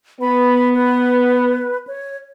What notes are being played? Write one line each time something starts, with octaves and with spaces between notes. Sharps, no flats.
B3 B5
B4
C#5